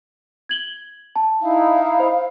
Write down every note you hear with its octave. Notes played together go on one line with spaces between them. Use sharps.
G#6 F#7 G7
A5
D#4 E4 F5
C5 B5